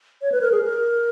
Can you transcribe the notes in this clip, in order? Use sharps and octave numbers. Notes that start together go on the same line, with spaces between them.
C#5
B4
A#4
G#4
A#4